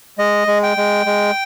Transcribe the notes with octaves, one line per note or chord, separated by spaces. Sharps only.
G#3 D#5
G#3
G5
G#3
G#3